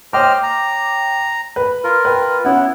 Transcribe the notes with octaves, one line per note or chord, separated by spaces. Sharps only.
C5 C#5 D#5 G5 D6 F6
A#5
B4
F4 A#4
B4 G5
B3 C#4 E4 F#5